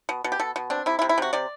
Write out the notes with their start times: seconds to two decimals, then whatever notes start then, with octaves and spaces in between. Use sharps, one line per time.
0.09 B2
0.24 B2
0.32 G4
0.40 B2 A4
0.56 B2
0.70 C4 D4
0.86 C3 E4
0.99 E4
1.02 C3
1.09 E4
1.18 C3 F#4
1.33 C3 D5